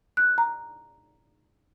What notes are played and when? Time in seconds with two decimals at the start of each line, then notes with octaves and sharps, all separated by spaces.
0.17 F#6
0.38 A#5